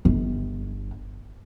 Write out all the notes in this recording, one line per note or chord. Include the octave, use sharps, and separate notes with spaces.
G1